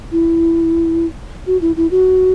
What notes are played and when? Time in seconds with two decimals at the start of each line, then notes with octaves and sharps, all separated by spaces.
0.12 E4
1.47 F#4
1.61 E4
1.77 E4
1.91 F#4